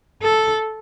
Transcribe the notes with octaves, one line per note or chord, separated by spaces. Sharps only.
A4